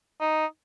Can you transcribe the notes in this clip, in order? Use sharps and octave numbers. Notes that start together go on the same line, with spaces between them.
D#4